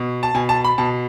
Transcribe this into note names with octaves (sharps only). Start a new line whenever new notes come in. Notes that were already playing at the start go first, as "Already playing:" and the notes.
Already playing: B2
A5
B2 G#5
A5
B5
B2 A5